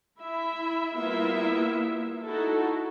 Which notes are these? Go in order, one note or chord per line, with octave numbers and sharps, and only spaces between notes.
E4 E5 B5
G3 A#3 B3 E4 F4 E5
D#4 E4 F#4 A4